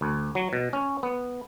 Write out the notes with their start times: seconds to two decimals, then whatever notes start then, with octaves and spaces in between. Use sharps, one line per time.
0.01 D2
0.35 F#3
0.53 B2
0.73 C#4
1.03 B3